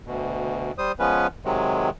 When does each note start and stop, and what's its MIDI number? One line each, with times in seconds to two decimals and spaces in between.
0.07 0.72 38
0.07 0.72 47
0.78 0.92 55
0.78 0.92 72
0.78 0.92 87
0.99 1.27 53
0.99 1.27 56
0.99 1.27 59
0.99 1.27 61
0.99 1.27 71
1.45 1.90 48
1.45 1.90 51
1.45 1.90 54
1.45 1.90 56